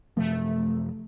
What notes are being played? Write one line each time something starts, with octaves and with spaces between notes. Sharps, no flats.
F#2 C3 F3 A3